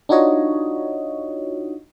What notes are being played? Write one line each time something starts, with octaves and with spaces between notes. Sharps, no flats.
D4 D#4 F4 F#4 C#5 D#5